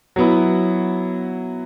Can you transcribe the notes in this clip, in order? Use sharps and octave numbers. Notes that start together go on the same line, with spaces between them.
F#3 B3 E4